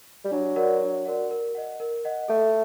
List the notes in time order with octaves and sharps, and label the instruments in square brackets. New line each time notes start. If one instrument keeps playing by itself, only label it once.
[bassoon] G3
[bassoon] F#3 [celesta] D4
[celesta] F#4 A#4 D5 F#5
D4
F#4 A#4 D5 F#5
A#4
D#5 F#5
A#4
D#5 F#5
[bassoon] A3 [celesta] A4